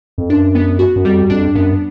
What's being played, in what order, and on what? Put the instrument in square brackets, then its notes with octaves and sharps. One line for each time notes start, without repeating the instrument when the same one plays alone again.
[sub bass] F2
[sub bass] F#2 [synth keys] D4
[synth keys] B3
F#4
[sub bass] F#2
[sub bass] F2 [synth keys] G3
[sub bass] F2 [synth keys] D4
[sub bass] F#2 [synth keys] B3